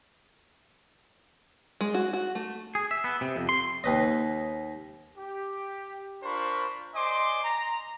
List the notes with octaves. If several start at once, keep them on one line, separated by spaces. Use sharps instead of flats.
G#3
F#4
F#4
A3
G#4
E5
B3
C3
F2
C6
D#2 B4 D#5
G4
D4 F4 A#4 C5 B5 C#6
C5 D5 D#5 G#5 C6 D6
A#5